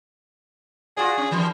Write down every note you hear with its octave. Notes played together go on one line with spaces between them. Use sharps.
F4 F#4 G#4 D5
C#4
D#3 E3 G3